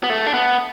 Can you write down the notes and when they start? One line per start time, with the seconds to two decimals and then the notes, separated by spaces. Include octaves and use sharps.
0.04 B3
0.10 A3
0.26 D4
0.34 B3